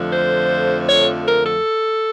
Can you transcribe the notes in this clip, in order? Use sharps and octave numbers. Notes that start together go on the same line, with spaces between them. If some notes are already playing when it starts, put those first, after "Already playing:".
Already playing: F2 D3 F3 A3
C5
C#5
A#4
A4